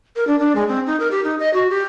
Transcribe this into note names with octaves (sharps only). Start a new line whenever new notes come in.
A#4
D4
D4
G#3
C4
D#4
A#4
G4
D#4
D#5
F#4
G4